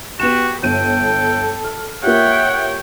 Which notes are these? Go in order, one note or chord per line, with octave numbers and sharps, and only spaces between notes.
B3 F#4 G4 E7
G1 A4 G5 D#7
F6
A#3 F4 G4 C#5 E5 F#5 G5